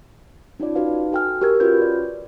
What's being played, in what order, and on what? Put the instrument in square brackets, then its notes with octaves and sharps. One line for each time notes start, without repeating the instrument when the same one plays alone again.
[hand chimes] C#4 D#4 F4 D5
D#4 F#4 B4 F5
F#4 A4 G5 G#5 F6
G4 A#4 G#6
C#4 F4 F#4 B4 G6
D5